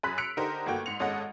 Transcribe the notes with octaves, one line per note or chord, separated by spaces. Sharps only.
F#2 G#4 B5 F#6 B6
E6 F#6 B6 C#7 D7 F7
D3 D#4 G4 A#4 C5
G1 A3 A#3 F#4 G5
G#2 C#7 F7
G#1 G#3 C#4 A4 D#5 F#5